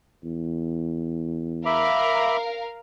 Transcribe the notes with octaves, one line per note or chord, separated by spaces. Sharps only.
E2
A#4 E5 F5 B5 D6